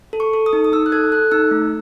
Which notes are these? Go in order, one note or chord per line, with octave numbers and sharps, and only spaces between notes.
A4
C#6
A4
D#6
D#4
D#6
D#4 E6
F#6
A4 G#6
A4 F#6
D#4 E6
A3